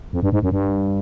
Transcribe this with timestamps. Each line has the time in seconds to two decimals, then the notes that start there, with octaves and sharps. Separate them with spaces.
0.13 F2
0.23 G2
0.32 G#2
0.43 F#2
0.52 G2